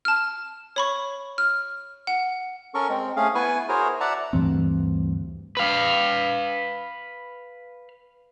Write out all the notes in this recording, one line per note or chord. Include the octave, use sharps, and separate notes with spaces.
A5 F6
C#5 B5 C#6
F6
F#5
C#4 A4 A#4 C#6
G#3 C4
A3 C#4 G#4 F5
B3 E4 B4 G#5 C#6
E4 F#4 G#4 A#4 C5 C#5
D5 E5 F#5 A5 A#5
D2 G2 E3 C4
B4 F5